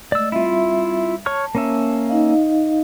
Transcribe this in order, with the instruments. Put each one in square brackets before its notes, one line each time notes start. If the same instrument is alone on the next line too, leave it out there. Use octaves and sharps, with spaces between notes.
[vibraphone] G#3 A3 D#5 [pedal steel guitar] D5 E6
[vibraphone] G3 C4 E5 [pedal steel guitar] E4 F4
[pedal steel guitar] C#5 C#6 F6 [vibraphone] A5
[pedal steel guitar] A#3 C#4 E5
[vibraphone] D#4 D#5 F5